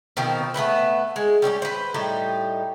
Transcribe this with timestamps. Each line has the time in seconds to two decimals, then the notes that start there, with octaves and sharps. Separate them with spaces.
0.17 B2 D#3 F3 C4
0.54 A3 B3 E4 B4
1.16 G#3
1.42 G3 C#4 D#4 G4
1.62 B4 C5
1.94 A2 G3 D#4 G4